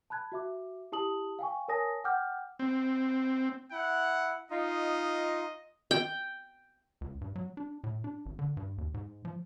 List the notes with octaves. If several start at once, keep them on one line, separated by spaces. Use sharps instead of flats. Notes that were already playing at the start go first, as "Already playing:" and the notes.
A5 B5 F#6 G#6
F#4 E5 D6
E4 G4 A5 D#6 F#7
F5 G5 G#5 C#6
A#4 C#5 G#5 A5 D#6 A#6
F#5 G5 D6 E6 F6 G6
C4
E4 F#5
D#4 F4 D#5
G5
C#2
G2
F#3
D4
A2
D4
G#1
D3
G2
D#2
G#2
F3